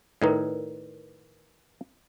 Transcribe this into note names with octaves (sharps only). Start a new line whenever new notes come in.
A2 D#3 D#4 A#4 B4 D5